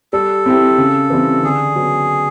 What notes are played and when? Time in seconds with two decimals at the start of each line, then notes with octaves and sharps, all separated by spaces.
0.13 G3 A4
0.46 C4 E4 G4
0.78 C#3
1.10 E3 G3 C4
1.43 D3 G#4
1.75 F#3 B3